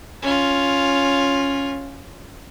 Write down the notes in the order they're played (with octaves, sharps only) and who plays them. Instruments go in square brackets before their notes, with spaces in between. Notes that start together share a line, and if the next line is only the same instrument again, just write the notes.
[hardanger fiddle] C#4 F4